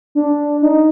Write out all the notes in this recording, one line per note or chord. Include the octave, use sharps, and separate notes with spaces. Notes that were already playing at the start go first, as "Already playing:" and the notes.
D4
D#4